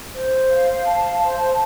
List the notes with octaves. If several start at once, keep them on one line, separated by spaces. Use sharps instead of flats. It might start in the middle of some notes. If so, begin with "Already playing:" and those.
C5
F5
A5
C5